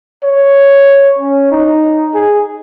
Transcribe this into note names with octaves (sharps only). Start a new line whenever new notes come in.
C#5
C#4
D#4
G#4